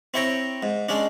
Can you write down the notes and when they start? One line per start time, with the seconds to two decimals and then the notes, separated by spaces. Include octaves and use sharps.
0.14 C4 E4 C#5 G5 A#5
0.63 G#2
0.89 G#3 C#4 D4